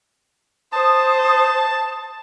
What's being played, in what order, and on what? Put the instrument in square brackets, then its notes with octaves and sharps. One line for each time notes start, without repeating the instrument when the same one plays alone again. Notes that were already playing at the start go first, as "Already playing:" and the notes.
[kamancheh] C5 [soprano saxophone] A5 [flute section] D#6